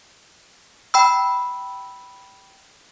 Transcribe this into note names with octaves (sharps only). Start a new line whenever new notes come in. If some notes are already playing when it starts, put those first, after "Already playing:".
G5 B5 E6